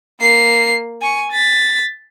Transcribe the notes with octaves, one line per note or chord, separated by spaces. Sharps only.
A#3 C7
G#5 C#6
A6 B6